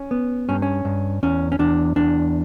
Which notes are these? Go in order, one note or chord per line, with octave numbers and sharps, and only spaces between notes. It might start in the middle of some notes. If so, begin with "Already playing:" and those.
Already playing: C#4
B3
G2 C#4
C#4
G2
E2 C#4
C#4
E2 D4
E2 D4